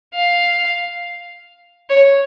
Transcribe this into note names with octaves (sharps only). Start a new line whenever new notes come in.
F5
C#5